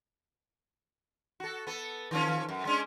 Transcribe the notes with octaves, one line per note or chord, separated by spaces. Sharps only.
F#4 A4
B3 A4
D#3 F3 C#4
F#2
G#3 C#4 D4